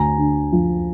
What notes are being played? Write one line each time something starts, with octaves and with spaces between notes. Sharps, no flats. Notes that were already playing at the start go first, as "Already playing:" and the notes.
Already playing: D2 G#5 A#5
D3
F3